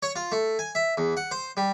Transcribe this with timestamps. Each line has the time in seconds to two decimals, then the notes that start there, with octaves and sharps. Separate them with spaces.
0.03 C#5
0.16 F4
0.32 A3
0.59 G#5
0.75 E5
0.97 E2
1.17 F#5
1.31 C5
1.57 G3